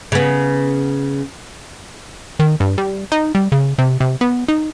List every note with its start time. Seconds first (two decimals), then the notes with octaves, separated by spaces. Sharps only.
0.12 C#3 B3
2.39 D#3
2.60 G2
2.78 G3
3.12 D#4
3.35 G3
3.52 C#3
3.78 C3
4.00 C3
4.21 B3
4.48 D#4